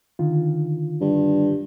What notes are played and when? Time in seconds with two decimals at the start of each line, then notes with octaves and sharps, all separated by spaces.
0.19 D3 D#3 F4
1.01 G2